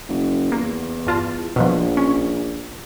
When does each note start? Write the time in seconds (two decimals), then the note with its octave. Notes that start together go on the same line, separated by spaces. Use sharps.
0.09 F#1
0.52 E2 A#3
1.07 G2 F4 A5
1.56 A#1 B2 F3
1.97 C#4